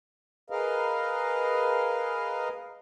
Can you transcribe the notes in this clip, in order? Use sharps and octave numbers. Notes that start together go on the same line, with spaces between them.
G#4 A#4 B4 D#5 F5